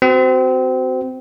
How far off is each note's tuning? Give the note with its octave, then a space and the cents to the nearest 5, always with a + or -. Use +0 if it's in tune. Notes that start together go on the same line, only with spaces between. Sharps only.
C4 -25 F#4 +15